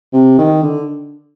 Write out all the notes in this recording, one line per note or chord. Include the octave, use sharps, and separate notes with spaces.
C3
D#3
D3